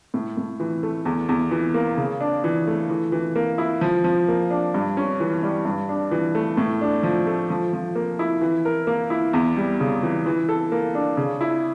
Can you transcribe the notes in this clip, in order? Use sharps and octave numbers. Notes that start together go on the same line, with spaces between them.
A2
A2
E3
A3
E2
E2
E3
A#3
C#3
D4
E3
A3
E3
E3
A#3
E4
F3
F3
A#3
D4
G2
C#4
E3
G3
G2
D4
E3
A3
A2
D4
F3
A3
F3
F3
A#3
E4
E3
A#4
A#3
E4
E2
G3
C#3
E3
E3
A4
A#3
D4
C#3
E4